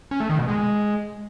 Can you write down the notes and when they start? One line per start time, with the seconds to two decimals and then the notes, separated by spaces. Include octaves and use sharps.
0.11 C#4
0.20 A3
0.30 D#3
0.39 B2
0.48 G#3